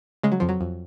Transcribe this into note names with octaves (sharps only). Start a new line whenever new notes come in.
C#3 G#3
F#3
F2 F3
F#3
F2